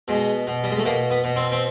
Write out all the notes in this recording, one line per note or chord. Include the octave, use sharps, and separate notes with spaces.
B2 G#3
B2
G3
G#3
A3
B2 A#3
B3
B2
C4
C4